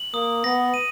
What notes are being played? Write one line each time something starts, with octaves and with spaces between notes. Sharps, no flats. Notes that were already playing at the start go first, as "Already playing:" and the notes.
Already playing: F#7
A#3 D#6
B3 A#6
D#7